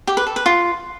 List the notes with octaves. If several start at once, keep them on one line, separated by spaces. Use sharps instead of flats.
G4
B4
A4
B4
F4